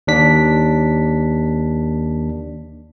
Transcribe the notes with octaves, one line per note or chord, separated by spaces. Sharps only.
D#2 D4 B6